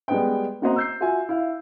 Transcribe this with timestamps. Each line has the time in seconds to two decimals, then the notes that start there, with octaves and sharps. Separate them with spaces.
0.08 G3 G#3 B3 G5
0.62 A#3 C4 F#4 C5 D#5 A#5
0.76 E6 G6 C7
1.00 F4 F#4 E5 G#5
1.29 E4 F5